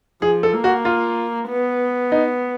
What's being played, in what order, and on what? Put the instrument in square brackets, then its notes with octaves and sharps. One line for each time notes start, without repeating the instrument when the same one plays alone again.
[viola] F3 [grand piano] G#4
[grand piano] A4
[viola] A#3
[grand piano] F#4
F4
[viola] B3
[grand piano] D#4